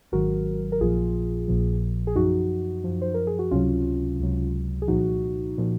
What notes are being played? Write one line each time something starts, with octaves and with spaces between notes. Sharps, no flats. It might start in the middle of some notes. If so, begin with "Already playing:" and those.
G#1 G#2 D#3 F#3 F#4 A#4
A#4
A#1 A#2 F3 F4 G#4
A#1 A#2 F3
G#4
F#2 F3 D#4 F#4
F#2 F3
C5
A#4
G#4
F#4
C#2 C3 F#3 C#4 F4
C#2 C3 F#3
G#4
C2 A#2 F3 D#4 F#4
A#2 F3